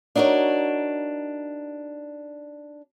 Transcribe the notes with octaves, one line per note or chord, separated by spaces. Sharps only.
D4 D#4 F#4 A#4 C#5